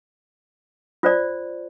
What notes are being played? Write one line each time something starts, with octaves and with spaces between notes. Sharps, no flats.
F4 C5 D5